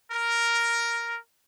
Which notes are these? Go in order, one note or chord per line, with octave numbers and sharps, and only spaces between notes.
A#4